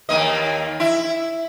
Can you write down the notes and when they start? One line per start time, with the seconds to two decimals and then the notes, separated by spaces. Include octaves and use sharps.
0.09 D#2 A#3 D#5
0.80 E4